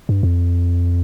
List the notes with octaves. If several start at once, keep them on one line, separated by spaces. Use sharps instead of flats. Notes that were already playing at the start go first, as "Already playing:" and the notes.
G2
F2